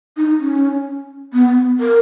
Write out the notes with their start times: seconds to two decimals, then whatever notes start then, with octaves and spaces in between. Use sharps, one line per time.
0.17 D#4
0.40 C#4
1.33 B3
1.80 A#4